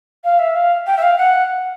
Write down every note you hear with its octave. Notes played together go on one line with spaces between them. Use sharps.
F5
E5
F5
G5
E5
F5
F#5